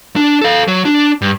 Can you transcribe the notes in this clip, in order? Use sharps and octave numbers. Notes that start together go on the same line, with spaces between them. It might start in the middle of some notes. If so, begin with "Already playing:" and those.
D4
A4 F5
F#3
D4
G2